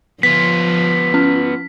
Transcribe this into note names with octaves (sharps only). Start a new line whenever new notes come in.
F3 B3 F4 B6
C#4 F6